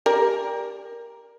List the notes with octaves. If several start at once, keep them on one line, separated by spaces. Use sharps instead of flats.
G4 A#4 D5